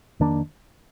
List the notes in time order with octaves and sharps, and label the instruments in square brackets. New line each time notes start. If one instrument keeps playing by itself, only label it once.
[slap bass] F2 D#3 A#3 D4